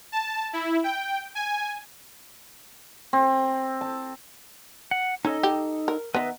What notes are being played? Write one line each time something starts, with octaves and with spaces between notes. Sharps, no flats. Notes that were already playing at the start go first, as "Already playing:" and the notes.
A5
E4
G5
G#5
C4
A5
F#5
C#4 D#4 A4 D#5
G4
A#4
D#3 B3 B4 D#5 E5